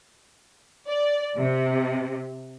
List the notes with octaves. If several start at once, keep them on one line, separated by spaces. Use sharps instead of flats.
D5
C3